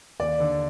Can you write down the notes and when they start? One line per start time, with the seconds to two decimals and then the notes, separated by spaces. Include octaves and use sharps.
0.20 D#2 D5
0.40 D3